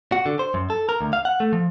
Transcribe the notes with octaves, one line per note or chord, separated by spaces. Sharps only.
F#4
D3
C5
F#2
A4
A#4
D2
F5
F#5
A3
F3